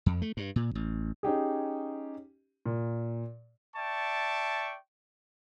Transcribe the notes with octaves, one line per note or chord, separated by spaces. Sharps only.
F2
A3
G2
A#2
A1
C#4 D#4 G4 G#4
A#2
D5 E5 G5 A5 C#6